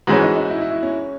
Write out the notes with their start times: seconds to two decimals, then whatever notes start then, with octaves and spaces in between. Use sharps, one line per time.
0.07 G#2 E3 G#3 C#4 F#4
0.22 D#4
0.36 D#4
0.50 E4
0.61 E4
0.71 E4
0.83 C#4